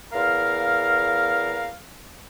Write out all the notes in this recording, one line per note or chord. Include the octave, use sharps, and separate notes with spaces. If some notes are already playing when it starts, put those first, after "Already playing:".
E2 A#4 F5